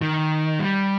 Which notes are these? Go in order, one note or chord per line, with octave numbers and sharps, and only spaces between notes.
D#3
G3